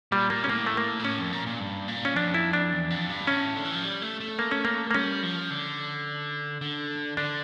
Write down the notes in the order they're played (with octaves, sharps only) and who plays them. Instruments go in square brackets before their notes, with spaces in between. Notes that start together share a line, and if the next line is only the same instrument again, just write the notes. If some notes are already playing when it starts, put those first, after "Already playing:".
[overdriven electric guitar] A#2 [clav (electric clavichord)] G3
[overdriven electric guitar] A#2 [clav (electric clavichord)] A#3
[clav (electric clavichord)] C#4
[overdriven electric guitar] A2 [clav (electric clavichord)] A#3
[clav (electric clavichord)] A3
A#3
[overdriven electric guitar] A#2
[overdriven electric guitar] A2 [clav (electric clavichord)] C#4
[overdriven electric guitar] F2
A#2
A#2
G2
A#2
[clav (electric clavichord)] C#4
[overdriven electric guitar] F2 [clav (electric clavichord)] D4
[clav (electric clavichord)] E4
D4
[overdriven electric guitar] E2
F2
G2
[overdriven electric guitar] A2 [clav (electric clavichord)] C#4
[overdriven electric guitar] D3
E3
F3
G3
A3
A3
[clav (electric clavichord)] A#3
C#4
A#3
A#3
[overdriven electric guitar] G3 [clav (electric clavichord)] C#4
[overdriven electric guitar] F3
D3
D3
[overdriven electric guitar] D3 [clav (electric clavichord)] D4